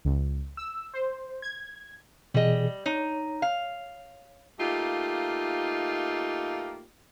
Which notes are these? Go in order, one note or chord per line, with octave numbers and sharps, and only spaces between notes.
C#2
E6
C5
G#6
B2 E3 G3 G#4 D#5
D#4 C#5
F5
A3 A#3 D#4 F4 G4